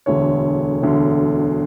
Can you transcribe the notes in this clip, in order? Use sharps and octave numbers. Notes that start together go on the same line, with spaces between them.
E1 D2 D3 C#5
E1 D2 D3